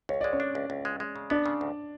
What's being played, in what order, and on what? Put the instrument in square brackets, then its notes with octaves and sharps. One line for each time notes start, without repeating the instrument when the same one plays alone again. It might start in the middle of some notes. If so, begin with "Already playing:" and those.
[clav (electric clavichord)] C#2 [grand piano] C#5
[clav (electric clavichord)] G#3 [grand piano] D5
[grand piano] C#4 C#5
[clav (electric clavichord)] D4
C#2
C#2
G#3
G#3
C#3
[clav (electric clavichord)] B3 [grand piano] D4 D5
[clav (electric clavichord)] C#3
D2